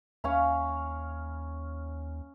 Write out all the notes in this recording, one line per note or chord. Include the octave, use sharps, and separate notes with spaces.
D#2 C#4 F5 B5